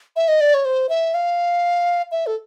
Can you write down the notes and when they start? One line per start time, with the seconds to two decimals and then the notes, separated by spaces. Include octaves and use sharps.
0.16 E5
0.28 D#5
0.41 D5
0.54 C#5
0.65 C5
0.89 E5
1.14 F5
2.12 E5
2.27 A4